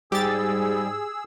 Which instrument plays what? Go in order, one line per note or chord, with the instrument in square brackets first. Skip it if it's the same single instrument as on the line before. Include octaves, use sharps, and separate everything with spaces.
[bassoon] G#2 [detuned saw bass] G3 [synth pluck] G4 A6 [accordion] G#4 E6